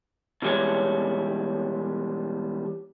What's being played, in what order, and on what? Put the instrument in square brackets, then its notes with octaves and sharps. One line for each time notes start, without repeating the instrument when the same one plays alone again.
[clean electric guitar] B2 E3 G3 G#3 C#5